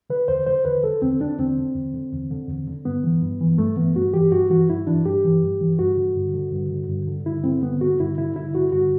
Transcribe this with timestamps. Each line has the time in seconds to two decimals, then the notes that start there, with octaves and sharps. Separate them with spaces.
0.10 D3 B4
0.28 E2 C5
0.46 D3 C5
0.65 E2 B4
0.83 D3 A4
1.02 E2 C4
1.20 D3 D4
1.39 E2 C4
1.57 D3
1.76 E2
1.94 D3
2.12 E2
2.31 D3
2.48 E2
2.67 D3
2.85 G2 B3
3.04 E3
3.22 G2
3.41 E3
3.58 G2 A3
3.77 E3 B3
3.96 G2 F#4
4.13 E3 G4
4.32 G2 F#4
4.50 E3 F#4
4.69 G2 E4
4.87 E3 D4
5.05 G2 G4
5.25 E3
5.43 G2
5.61 E3
5.79 G2 F#4
5.97 D3
6.16 G2
6.34 D3
6.52 G2
6.71 D3
6.89 G2
7.07 D3
7.25 G2 E4
7.44 D3 C4
7.63 G2 B3
7.81 D3 F#4
8.00 G2 E4
8.18 D3 E4
8.36 G2 E4
8.55 D3 F#4
8.72 G2 F#4